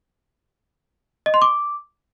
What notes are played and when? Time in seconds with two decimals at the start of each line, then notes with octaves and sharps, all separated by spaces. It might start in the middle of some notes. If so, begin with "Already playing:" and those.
1.26 D#5
1.34 C6
1.42 D6